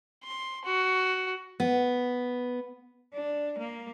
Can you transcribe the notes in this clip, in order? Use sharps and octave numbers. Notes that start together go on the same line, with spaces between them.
C6
F#4
B3
D4
A#3